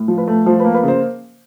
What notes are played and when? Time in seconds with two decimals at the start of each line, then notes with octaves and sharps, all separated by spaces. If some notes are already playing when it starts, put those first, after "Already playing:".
Already playing: A2
0.08 F3
0.18 B4
0.28 A3
0.46 F3 C5
0.60 A#3 B4
0.74 B4
0.83 C#3 C5